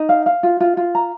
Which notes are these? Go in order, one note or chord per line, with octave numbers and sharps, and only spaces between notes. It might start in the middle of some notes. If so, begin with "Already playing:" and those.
Already playing: D#4
F5
F5
F4
F4
F4
A#5